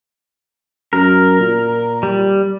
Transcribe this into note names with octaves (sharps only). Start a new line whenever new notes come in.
F#2 A#4
A#2
G3